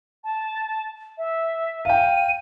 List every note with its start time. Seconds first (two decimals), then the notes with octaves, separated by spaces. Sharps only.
0.24 A5
1.18 E5
1.85 F5 G5 D#7